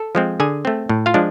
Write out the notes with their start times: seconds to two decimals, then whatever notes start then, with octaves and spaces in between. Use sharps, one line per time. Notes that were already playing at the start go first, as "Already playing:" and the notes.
Already playing: A4
0.15 F3 G#3 C4
0.40 D3 G#4 G#5
0.65 A3 C4
0.89 A2
1.06 F4 F5
1.14 F3 G#3 D4